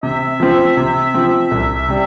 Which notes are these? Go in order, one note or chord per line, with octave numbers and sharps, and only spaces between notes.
C3 E5
F3 C4
C3
F3 C4
C2
C3 G3